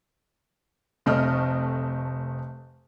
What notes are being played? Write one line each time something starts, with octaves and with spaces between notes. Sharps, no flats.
F1 A3 C4 D#5 F6